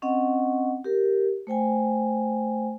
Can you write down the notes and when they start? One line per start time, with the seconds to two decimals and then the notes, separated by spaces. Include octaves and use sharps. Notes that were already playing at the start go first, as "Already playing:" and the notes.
0.02 C4 C#4 D#5 F#5
0.84 G4 A#4
1.47 A3 C5 G5 G#5